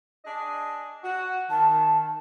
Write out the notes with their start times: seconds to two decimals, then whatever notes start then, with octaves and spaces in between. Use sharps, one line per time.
0.25 D4 G#4 D#5
1.03 F#4
1.50 D#3 A5